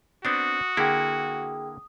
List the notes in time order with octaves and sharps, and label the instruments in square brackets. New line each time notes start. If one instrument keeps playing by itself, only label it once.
[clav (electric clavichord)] B3 C4 D4 [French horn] F#4 [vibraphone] D#6
[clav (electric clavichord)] D3 A#3 E4 [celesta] G#4 G5